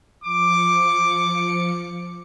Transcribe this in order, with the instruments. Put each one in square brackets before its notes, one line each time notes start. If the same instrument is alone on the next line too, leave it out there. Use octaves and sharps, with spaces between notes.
[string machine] F3 C#7 [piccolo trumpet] D6